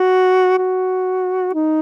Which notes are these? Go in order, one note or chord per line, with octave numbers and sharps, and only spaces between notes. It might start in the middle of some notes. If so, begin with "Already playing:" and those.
Already playing: F#4
F#4
D#4